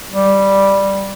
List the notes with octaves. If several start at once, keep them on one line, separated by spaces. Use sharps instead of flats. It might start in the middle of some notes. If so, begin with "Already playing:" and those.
G3